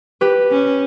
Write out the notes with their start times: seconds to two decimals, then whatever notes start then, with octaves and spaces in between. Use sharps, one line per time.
0.21 G4 B4
0.51 C#4